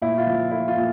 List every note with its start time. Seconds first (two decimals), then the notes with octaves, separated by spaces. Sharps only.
0.02 A#2 E4
0.18 F4
0.27 F3
0.51 A3 E4
0.68 F4
0.76 A#2